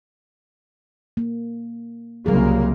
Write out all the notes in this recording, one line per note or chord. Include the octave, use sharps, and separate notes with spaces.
A#3
C2 C#3 F#3 G3 A#3 G#4